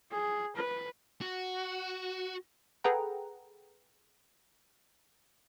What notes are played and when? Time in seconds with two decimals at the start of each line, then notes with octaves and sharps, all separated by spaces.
0.12 G#4
0.57 B4
1.21 F#4
2.84 G#4 A4 B4 F#5 G5 A#5